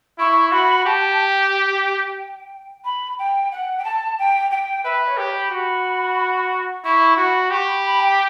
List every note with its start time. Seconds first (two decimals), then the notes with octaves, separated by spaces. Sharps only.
0.18 E4 C#6
0.52 F#4 B5
0.86 G4 A5
1.19 G5
2.84 B5
3.18 G5
3.52 F#5
3.78 G5
3.85 A5
4.19 G5
4.51 G5
4.85 B4 E5
5.07 C#5
5.18 G4
5.29 B5
5.51 F#4
6.84 E4 C#6
7.17 F#4 B5
7.50 G4 C#6
7.68 B5
7.84 B5
8.00 G5